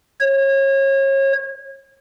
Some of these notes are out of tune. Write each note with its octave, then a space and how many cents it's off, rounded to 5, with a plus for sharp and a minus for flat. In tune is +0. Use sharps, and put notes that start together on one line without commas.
C#5 -30